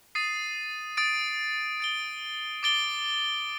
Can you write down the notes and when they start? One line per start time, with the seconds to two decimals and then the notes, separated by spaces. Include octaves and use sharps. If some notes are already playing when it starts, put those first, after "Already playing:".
0.15 D#6 A6 C7 D#7
0.97 D#6 A6 D7
1.80 A6 D7 G7
2.63 D6 A6 D7 G7